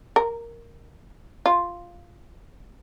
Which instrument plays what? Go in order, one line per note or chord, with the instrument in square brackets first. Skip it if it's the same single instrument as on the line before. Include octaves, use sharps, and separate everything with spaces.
[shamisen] A#4
F4